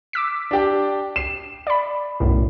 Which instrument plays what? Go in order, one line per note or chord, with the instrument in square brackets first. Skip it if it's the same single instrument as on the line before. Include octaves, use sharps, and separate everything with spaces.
[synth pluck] D6 E6 B6
[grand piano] D4 G4 G5
C7 E7
[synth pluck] D5 B5
B1 F#2 A2